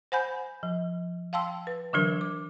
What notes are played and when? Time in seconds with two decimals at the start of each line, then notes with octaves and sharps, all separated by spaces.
0.12 C5 F#5 G#5 B5 G6
0.63 F3
1.33 F5 G5 A5 C6 E6
1.67 B4
1.93 D3 E3 F#3 D4 A#4
2.21 D6